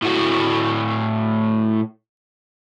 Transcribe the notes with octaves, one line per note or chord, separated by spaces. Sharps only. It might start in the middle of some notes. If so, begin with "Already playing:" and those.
A2 F#4